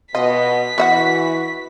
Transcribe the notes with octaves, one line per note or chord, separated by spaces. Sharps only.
B2 F4 D#5 B6
E3 B3 F#4 E5 F#5